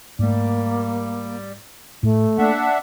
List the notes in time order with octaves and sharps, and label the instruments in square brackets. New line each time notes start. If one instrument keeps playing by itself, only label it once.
[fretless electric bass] G#2 A3 [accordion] G3 [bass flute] A#3
[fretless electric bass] A2 [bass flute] A3
[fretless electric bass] A#3 [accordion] D4 E5 F#5